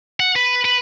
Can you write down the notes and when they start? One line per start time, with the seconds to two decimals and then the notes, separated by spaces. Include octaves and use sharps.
0.20 F#5
0.36 B4
0.65 B4